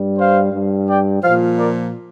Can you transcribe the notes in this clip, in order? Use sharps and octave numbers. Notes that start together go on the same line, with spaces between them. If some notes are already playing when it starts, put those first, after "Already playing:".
Already playing: G2 G3
C5 F5
G2 G3
D5 G5
A#2 F3 C5 F5
A#4 D5